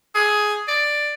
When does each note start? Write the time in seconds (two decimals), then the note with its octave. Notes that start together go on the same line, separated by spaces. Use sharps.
0.15 G#4
0.68 D5